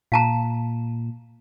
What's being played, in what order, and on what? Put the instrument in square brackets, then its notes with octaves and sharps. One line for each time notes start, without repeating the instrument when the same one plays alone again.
[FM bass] A#2 [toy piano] F5 A5 A#5